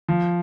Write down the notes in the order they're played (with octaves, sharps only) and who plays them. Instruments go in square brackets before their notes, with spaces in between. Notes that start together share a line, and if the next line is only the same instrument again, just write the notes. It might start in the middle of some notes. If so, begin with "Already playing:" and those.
[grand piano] F3